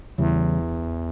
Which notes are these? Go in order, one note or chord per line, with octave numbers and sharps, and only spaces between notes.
E2 C#3 E3 G3